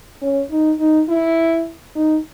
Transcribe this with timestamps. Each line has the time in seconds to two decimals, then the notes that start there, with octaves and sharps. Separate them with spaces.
0.22 C#4
0.50 D#4
0.79 D#4
1.08 E4
1.95 D#4